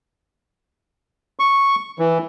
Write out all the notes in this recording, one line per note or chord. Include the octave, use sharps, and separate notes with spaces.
C#6
E3